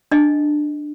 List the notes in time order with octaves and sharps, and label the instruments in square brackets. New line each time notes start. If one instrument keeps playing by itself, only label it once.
[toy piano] D4 D#5